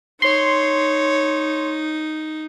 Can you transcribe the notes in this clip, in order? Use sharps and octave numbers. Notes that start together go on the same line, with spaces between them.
D#4 C#5 C6